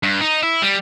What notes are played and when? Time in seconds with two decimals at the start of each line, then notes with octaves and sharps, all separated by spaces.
0.03 G2
0.21 D#4
0.43 E4
0.62 G3